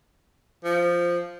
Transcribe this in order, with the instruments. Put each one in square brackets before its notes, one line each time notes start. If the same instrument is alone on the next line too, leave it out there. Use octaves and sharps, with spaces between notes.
[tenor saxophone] F3